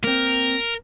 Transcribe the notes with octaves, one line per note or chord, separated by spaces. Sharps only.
A#3 C4 A#4